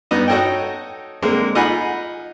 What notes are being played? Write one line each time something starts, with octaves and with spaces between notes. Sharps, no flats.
G2 B3 D#4
D#4 F#4 A4 C#5 D#5 G5
D3 G#3 A#3 C4
D#4 F4 F#5 G#5 B5